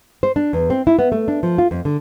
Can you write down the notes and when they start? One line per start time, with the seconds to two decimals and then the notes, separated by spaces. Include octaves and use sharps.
0.23 C5
0.36 D4
0.53 E2
0.70 C4
0.87 E4
0.99 B3
1.12 A3
1.28 D4
1.43 F3
1.58 F4
1.71 F2
1.85 D3